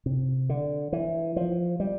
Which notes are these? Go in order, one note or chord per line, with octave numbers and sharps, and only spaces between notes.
C3
D3
E3
F3
G3